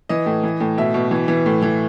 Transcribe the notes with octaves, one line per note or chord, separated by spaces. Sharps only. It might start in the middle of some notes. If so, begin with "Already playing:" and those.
E3 D#5
A2
E3
A2
B2 E5
B2
E3
E3
A2
E3